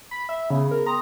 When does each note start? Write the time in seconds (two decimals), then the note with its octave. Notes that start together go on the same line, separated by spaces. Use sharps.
0.11 B5
0.29 E5
0.50 C#3 B3 G#4
0.71 A#4
0.86 G5 A#5 C6 D#6